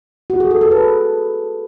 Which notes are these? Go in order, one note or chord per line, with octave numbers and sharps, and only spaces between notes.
F#4
G#4
A4
A4
B4